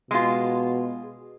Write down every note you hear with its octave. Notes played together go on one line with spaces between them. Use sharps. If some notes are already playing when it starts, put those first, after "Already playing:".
B2 G#3 F4